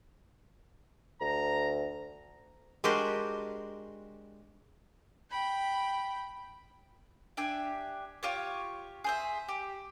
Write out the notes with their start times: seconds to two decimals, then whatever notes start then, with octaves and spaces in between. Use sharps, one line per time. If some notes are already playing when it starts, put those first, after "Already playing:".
1.21 D2 A#5
2.84 G#3 D4 F#4 G4 A#4 C5
5.31 G5 B5
7.37 D4 G4 E5 G#5
8.23 F4 G4 C#5
9.04 G#4 C5 E5
9.49 G4